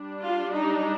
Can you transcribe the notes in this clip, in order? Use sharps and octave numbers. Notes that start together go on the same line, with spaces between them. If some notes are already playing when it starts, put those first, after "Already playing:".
Already playing: G3 D4
F4
D#4